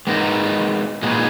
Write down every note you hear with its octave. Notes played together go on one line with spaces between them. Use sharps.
G#3 B3 D#4 A#4
A#2 G#3 B3 D#4